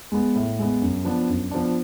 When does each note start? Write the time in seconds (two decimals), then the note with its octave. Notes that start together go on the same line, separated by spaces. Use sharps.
0.12 G#3 B3
0.35 A2
0.59 G#3 B3
0.82 F#2
1.05 F3 B3 D4
1.29 F#2
1.51 F3 B3 D4